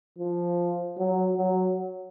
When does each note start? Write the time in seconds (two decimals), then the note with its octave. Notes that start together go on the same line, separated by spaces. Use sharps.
0.19 F3
0.98 F#3
1.37 F#3